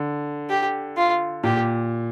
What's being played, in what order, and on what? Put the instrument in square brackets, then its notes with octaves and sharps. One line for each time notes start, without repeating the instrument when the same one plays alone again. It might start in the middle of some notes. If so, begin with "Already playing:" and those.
Already playing: [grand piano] D3
[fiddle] G4
F4
[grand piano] A#2 [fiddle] G4